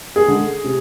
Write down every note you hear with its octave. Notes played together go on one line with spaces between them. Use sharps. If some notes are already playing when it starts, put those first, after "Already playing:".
G#4
D3 G#3
C3